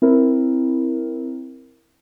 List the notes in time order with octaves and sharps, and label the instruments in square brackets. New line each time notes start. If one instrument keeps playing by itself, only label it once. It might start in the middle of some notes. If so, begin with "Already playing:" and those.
[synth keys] C4 E4 A#4